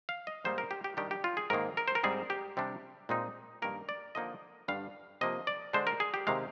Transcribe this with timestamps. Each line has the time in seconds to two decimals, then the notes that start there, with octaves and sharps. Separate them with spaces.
0.09 F5
0.27 D#5
0.45 G#2 G3 A#3 D#4 C5
0.58 A#4
0.71 G4
0.84 G4
0.97 D#3 G3 D4 G4
1.11 G4
1.24 F4
1.37 G#4
1.50 G#2 D#3 A#3 A#4
1.77 A#4
1.88 C5
1.95 A#4
2.04 G#2 G3 C4 D#4 G#4
2.30 G4
2.57 C3 G3 D4
3.09 A#2 G#3 C4 D#4
3.62 G2 D#3 A#3 A#4
3.89 D5
4.15 D3 F3 A#3 D#4 D#5
4.68 G2 D3 G3 D4 F5
5.21 C3 F3 A#3 D#5
5.47 D5
5.73 D3 G#3 D4 C5
5.87 A#4
6.00 G#4
6.14 G4
6.27 C3 D#3 G#3 F5